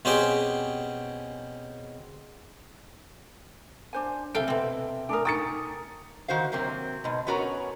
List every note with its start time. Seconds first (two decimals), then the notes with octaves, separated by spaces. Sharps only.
0.05 B2 C4 C#4 G4 G#4 G5
3.93 D4 C5 G#5
4.35 C3 A4 E5 F5 G5 D7
4.48 B2 C4
5.09 A3 D4 A#4 G#5 A5 D#6
5.25 D#4 G5 A#5 C#6 D#6 A6 C#7
6.28 D#3 F#4 C5 F5
6.52 C3 F#3 A#3 C4
7.04 G#2 B2
7.27 B3 C#4 F#4 A#4 C#5 A#5